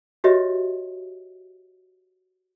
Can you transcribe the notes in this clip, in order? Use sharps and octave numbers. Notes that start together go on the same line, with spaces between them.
F#4 G4 B4 C#5 D#5 E5